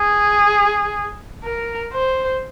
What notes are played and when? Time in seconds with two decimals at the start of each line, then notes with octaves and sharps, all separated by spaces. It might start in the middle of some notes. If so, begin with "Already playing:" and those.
Already playing: G#4
1.44 A#4
1.93 C5